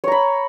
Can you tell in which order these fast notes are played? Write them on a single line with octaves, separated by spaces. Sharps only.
C#5 A#5 B5